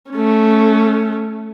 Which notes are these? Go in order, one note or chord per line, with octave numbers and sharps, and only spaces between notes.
A3 C#4